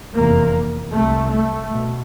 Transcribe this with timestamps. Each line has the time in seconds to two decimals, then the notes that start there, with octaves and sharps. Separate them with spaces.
0.15 F1 E2 C3 A#3
0.93 C2 C3 A3
1.32 A3
1.70 B2